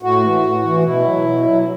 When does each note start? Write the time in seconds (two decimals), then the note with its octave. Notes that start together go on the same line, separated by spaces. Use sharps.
0.02 A2 F#4
0.22 E3
0.43 A2
0.63 E3
0.83 B2 E4
1.05 F#3
1.25 B2
1.45 F#3